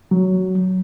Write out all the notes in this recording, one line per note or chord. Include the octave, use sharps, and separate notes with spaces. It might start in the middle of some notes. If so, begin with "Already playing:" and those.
F#3